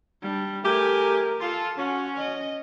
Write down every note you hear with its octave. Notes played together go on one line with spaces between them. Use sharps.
G3 D4
A3 G4 A#4 G#5
F4 A4
C#4 F#4
D#5